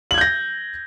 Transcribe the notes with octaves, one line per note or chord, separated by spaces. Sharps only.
G6 G#6 A#6 F#7